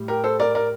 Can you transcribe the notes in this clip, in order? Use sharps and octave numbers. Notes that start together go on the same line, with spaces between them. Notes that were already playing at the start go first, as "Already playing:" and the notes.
Already playing: A2 G3
G4 A#4
A4 C5
A#4 D5
A#4 D5